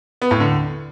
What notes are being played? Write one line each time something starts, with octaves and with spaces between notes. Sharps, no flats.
B3
A2
D3